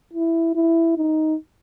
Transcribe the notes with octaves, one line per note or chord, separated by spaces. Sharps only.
E4
E4
D#4